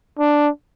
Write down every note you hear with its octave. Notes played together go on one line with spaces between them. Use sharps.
D4